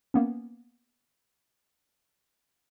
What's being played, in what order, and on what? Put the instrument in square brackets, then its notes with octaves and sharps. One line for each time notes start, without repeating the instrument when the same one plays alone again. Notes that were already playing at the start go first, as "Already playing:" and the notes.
[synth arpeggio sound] A#3 B3 C#4